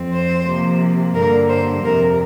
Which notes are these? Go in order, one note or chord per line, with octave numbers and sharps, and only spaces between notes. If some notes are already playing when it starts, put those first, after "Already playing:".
Already playing: F2 F3 C4
C5
C3 F3 A#3
G2 D3 G3 A#3 A#4
C5
F2 C3 F3 A#4